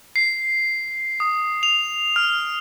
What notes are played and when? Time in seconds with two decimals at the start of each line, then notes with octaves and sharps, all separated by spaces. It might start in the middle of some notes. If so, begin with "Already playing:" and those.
0.16 C7
1.20 D#6
1.63 F7
2.16 F6